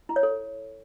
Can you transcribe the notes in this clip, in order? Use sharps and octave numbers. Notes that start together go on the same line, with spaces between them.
E4
C#5
A4